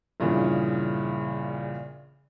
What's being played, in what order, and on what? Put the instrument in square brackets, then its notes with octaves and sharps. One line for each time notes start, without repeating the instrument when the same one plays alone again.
[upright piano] A#1 G2 A#2 C#3 E3